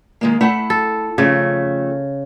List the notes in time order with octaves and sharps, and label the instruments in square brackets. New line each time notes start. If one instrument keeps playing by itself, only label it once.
[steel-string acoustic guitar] D#3 G#3 A#3
A3 E4 F#5
[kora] A4
[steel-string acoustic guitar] F2 A3 [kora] C#3